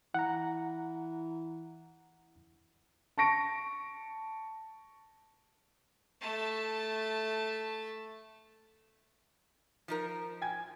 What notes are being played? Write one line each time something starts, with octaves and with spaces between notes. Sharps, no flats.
E3 F#5 A#5
A5 C#6 A#6 D7
A3 A5
F3 D#4 A#4
G5 G#5 G#6